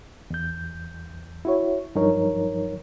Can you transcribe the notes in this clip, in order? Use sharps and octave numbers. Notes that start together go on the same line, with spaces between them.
E2 G6
E4 F#4 C#5
G2 F3 F#3 D#4 A#4 C#5